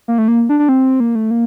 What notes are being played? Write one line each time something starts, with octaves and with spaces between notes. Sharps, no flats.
A#3
A3
A#3
D4
D4
C4
A#3
A3
A#3